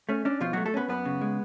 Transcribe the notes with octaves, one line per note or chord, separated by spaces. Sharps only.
A3 C#4
C#4 D4
B2 F3 F4
F#3 A3 F#4
A3 A4
B3 C#4 B4
F#2 B3 B4
C#3
G#3